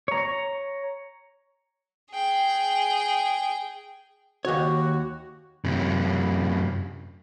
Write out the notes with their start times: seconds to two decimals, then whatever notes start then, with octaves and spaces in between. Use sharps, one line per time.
0.08 C#5 A#5
2.12 G#4 G5
4.45 D#2 F#4 C#5
5.65 F#2 C3